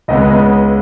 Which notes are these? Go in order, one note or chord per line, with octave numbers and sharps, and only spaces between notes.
C#2 C#3 G#3 B3 D#5
D#5